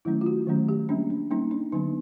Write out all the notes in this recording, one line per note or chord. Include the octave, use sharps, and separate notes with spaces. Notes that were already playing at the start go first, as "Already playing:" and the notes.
D#3 F#3 A3 C#4 E4
F4
F#4
D#3 F#3 A3 C#4
G4
G3 A#3 C#4 D4
D4
G3 A#3 C#4 D#4
D4
D3 F#3 B3 D4 D#4